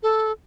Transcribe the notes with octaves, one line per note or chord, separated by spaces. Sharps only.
A4